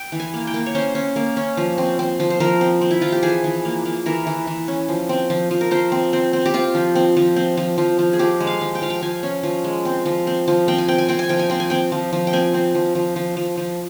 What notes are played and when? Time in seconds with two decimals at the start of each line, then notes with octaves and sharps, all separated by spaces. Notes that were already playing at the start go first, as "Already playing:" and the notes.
Already playing: G5
0.12 E3
0.20 G#5
0.34 A#3
0.47 G5
0.54 A#3
0.66 C#5
0.75 C#4 C5
0.95 C#4
1.16 A#3
1.37 C#4
1.57 F3
1.78 C4
1.99 C4
2.20 F3
2.30 C5
2.40 F3 A#4
2.61 C4
2.81 C4
2.91 E4
3.01 F3 F4
3.12 G4
3.23 E3 G#4
3.44 E3
3.65 A#3
3.85 A#3
4.06 E3 A#4
4.27 E3
4.47 E3
4.68 C#4
4.89 F3
5.09 C4
5.30 F3
5.51 F3
5.61 A#4
5.71 F3 C5
5.92 C4
6.13 C4
6.33 C4
6.46 G4
6.54 C4 F4
6.75 F3
6.95 C4
7.17 F3
7.36 C4
7.57 F3
7.78 F3
7.99 F3
8.13 G#4
8.19 F3 G4
8.40 G#3
8.47 F5
8.61 F3
8.75 G5
8.82 F3 F5
8.90 G5
9.02 F3 G#5
9.23 C#4
9.43 F3
9.64 G#3
9.85 C4
10.06 F3
10.27 C4
10.48 F3
10.68 C4 G5
10.78 G#5
10.88 C4 G5
10.98 G#5
11.09 C4 G5
11.19 G#5
11.29 F3 G5
11.39 G#5
11.50 C4 G5
11.60 G#5
11.70 C4 G5
11.92 F3
12.13 F3
12.27 G5
12.33 C4 G#5
12.54 C4
12.75 F3
12.95 F3
13.16 F3
13.37 F3
13.57 F3